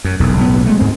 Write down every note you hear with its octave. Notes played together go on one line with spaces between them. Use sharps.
F#2
E1 B1 E2
B1 A2 B3
G#3 A3
D2 G#2 G#3 C4